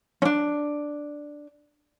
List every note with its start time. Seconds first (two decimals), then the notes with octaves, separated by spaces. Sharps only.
0.22 C#4 D4